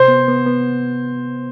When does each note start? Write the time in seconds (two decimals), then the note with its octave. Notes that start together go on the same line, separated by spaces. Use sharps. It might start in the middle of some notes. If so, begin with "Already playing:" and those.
Already playing: C3 C5
0.08 B3
0.28 B3
0.46 B3